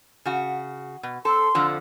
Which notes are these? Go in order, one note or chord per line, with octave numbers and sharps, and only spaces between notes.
C#3 F#4
B2
C4 A4 C6
F2 D3 F3